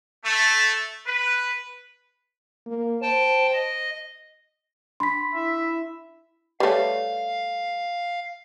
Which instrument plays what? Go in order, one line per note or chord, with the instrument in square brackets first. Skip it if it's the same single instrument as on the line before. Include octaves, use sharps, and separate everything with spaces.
[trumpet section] A3
B4
[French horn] A#3
[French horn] C5 [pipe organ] G5 A5
[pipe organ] D#5
[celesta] D4 B5 [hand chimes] C6 B6
[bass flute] E4 [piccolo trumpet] E5
[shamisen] G3 A3 [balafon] B4 C#5 [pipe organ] F5